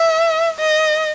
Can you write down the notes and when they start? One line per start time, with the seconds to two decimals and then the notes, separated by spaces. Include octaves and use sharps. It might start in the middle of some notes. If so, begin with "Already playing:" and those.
Already playing: E5
0.59 D#5